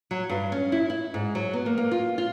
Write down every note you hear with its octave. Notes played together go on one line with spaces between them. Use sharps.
F#3
G2
C#4
E4
E4
G#2
F#3
B3
A#3
A#3
F4
F4